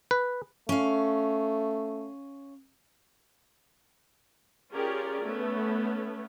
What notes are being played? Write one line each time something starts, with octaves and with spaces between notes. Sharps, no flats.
B4
A3 C#4 F5
C#4 F4 G4 G#4 A#4 D5
A3 B3 C#4